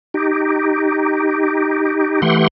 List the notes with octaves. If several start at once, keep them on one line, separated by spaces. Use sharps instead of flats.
D#4 G4
E3 A3 G4 F#5 C6